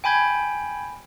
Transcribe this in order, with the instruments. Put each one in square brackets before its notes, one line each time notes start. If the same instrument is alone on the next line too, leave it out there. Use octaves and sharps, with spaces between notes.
[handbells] G5 G#5 B5 G6 G#6